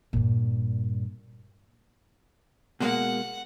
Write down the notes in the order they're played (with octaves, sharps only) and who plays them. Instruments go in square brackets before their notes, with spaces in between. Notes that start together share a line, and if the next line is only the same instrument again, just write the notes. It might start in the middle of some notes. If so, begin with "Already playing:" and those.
[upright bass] G2 A#2
[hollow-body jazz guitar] B2 G#3 A#3 [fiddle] F#5